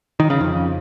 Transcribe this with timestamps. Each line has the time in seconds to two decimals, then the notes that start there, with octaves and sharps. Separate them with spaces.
0.20 D#3
0.30 C#3
0.40 F2